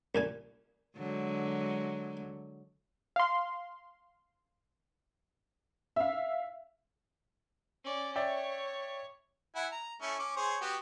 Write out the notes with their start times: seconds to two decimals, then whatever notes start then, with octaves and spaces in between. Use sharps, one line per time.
0.15 C2 A#2 G#5
0.97 D3 F#3 G#3
3.16 F5 C6
5.96 E5 F5
7.84 C#4 D5
8.16 C#5 D5 E5 G5
9.56 E4 F#5 G#5
9.72 A#5
10.02 A3 C#4 E4
10.19 C#4 D6
10.37 G#4 C5 C#5
10.61 B3 F#4 G4